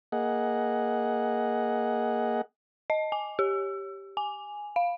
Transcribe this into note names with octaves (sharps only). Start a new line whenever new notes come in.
A#3 G#4 D#5 F#5
D#5
G#5
G4
G#5
F5